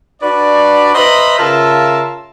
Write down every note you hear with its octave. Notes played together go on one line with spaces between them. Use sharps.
D4 F#4 B4 D5
B4 C5 D#5 E5 A#5 B5
C#3 F4 A#4 E5 F5 A5